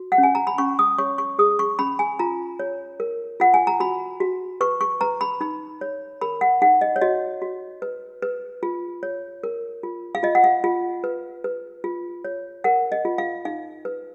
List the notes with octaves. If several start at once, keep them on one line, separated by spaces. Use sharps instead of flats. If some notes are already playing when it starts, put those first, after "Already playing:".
Already playing: F#4
F#5
C#4
G#5
A#5
B5
C#4 C#6
D#6
C#5 C#6
C#6
G#4 D#6
C#6
C#4 B5
G#5
F4 A#5
C#5
A#4
F4 F#5
G#5
A#5
F#4 B5
F#4
B4 C#6
C#6
B4 A#5
B5
D#4 B5
C#5
A#4 B5
F#5
D#4 F#5
D#5
C#5
F#4 D#5
F#4
B4
B4
F4
C#5
A#4
F4
F5
F4 D#5
F#5
F5
F4
B4
B4
F4
C#5
A#4 F#5
D#5
F4
F5
D#4 F5
B4